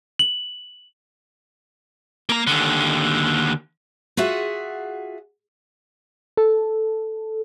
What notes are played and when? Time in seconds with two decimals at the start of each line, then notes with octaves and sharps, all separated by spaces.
0.19 F#7
2.29 A#3 A#5
2.47 D#2 D3
4.17 F4 F#4 G#4 E5 F#5
6.37 A4